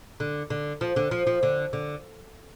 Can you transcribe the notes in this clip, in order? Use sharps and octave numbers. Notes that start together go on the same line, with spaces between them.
D3
D3
F3
D3
F3
F3
D3
D3